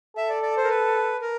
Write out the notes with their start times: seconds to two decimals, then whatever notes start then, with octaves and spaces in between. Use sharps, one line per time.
0.17 A4 E5
0.29 D5
0.43 D5
0.57 C5
0.64 A#4
0.69 B4
1.21 A#4